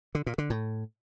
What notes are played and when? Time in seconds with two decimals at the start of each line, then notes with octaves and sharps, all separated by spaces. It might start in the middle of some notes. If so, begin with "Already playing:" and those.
0.15 D3
0.26 A#2
0.38 D3
0.50 A2